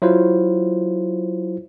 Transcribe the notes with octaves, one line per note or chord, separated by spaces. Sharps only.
F#3 E4 F4 C5